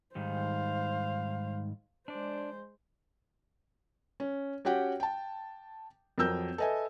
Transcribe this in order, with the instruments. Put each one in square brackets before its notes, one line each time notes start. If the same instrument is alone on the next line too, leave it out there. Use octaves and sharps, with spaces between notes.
[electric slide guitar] G#2 D#3 G3 [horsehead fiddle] C5 F5
[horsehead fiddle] G#3 C5 [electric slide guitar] D4 D5
[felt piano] C#4
C#4 F#4 G4 F#5 G5
G5 A5
F2 F#3 A#4 E6 G6
A4 B4 D#5 E5 G#5